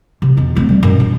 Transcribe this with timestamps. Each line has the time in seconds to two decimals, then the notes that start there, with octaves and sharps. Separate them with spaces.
0.22 C3
0.37 E2 B2
0.55 A3 C4
0.69 G3
0.83 F#2 B2
1.00 D4